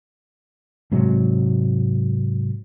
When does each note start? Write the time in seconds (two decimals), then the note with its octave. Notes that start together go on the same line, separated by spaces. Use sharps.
0.92 G#2 C3 F#3 G#3